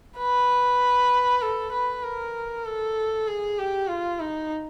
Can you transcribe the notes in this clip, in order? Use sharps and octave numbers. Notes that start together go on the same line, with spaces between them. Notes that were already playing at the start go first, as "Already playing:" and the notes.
B4
A4
B4
A#4
A4
G#4
G4
F4
D#4